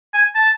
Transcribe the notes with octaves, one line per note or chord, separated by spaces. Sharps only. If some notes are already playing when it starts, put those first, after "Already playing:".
G#5
A5